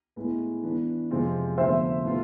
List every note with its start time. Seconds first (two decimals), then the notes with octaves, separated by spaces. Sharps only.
0.16 A2 G#3 B3
0.63 E3 B3 D4
1.10 F2 C3 G#3 C4 F4
1.57 D2 D3 F3 B3 C5 E5
2.04 B2 A3 C4 F4